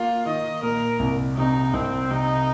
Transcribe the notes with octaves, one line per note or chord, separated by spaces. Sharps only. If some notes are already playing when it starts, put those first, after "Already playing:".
Already playing: A#3 F4
D#3 D#5
A#2 A#4
C2
C3 D#4
C2 C4
C3 D#4